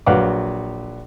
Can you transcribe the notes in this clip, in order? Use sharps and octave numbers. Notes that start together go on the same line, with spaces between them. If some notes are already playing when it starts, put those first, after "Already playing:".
A#1 F#3 B4 F5 F#5 D6